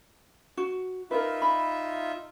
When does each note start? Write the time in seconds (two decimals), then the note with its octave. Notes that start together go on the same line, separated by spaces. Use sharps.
0.57 F#4
1.11 D#4 F4 A#4 B4 E5
1.42 B5